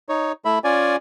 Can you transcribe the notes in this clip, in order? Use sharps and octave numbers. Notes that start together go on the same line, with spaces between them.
D#4 C#5
A3 E4 E5 B5
C#4 F4 D5 G#5